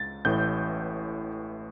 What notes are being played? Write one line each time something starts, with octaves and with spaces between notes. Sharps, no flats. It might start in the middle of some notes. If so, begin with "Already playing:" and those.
Already playing: C#2 A6
A1 A2 E3 G6